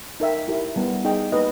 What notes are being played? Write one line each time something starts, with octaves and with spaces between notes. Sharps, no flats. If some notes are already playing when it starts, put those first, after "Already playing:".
D#4 A#4 E5 G5
E4 G4 A#4
G3 B3 E4
D#4 G#4 D#5 G5
A#3 D#4 G4 B4 D#5